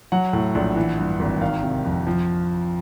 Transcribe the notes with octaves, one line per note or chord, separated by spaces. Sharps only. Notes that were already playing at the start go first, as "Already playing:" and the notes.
F#3 F#5
A2
A#1
E3
G2
G#1
D#3 F5
C3
F2
F3